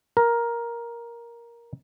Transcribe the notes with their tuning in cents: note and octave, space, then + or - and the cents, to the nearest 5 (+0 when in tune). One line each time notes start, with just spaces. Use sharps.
A#4 +10